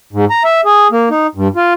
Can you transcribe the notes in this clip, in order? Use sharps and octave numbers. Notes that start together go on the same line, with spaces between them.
G#2
A#5
E5
G#4
A#3
D#4
G2
F4